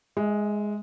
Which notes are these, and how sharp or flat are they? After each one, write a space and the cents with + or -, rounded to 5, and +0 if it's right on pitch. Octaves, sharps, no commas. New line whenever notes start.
G#3 +0 E5 -25